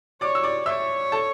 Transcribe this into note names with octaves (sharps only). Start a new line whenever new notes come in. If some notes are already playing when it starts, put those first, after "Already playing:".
C#5 D5 D6
E6
D5 D6
C#5 E5 E6
A4 A5